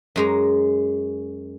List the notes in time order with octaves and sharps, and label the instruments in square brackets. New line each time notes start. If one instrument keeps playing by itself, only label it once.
[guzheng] F#2 G#3 A#5